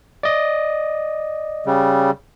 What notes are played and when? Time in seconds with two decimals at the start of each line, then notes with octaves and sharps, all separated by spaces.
0.23 D5 D#5
1.66 C#3 G3